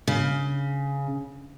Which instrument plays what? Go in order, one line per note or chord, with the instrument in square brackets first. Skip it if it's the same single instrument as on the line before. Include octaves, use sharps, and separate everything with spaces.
[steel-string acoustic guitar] C#3